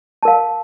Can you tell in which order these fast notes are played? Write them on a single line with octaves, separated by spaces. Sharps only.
A5 A#4 F5